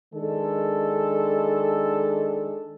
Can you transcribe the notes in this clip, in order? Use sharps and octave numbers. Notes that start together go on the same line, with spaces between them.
D#3 G#3 D4 A4